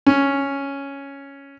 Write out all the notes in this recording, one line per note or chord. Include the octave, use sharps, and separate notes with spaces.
C#4